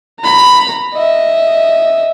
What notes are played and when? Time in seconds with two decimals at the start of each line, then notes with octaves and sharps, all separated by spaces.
0.20 A#5 B5
0.93 D#5 E5